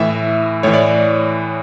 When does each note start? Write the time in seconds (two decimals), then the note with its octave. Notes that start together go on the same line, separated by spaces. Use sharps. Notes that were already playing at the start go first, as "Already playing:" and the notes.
Already playing: A2 E3 E5
0.63 A2 E3 C#5
0.74 D5